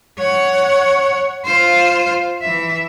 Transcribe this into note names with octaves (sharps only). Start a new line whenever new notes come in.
C#5 F#5
F4 C5
E3 E5